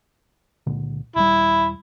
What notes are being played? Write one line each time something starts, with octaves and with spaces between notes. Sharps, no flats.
C#2 A#2 D3
D#1 G3 E4